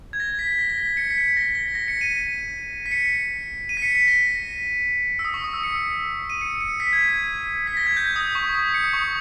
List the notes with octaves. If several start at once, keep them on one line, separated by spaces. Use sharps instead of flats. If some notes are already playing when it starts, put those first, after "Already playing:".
G#6
A#6
B6
A#6
A#6
B6
C#7
B6
C#7
B6
A#6
A#6
A#6
C#7
D#7
B6
C#7
D#7
B6
C#7
B6
A#6
E6
D#6
C#6
D#6
E6
C#7
D#7
C#7
C#7
B6
G#6
B6
A#6
G#6
G6
D#6
C#6
D#6
C#7
D#6
C#6
D#6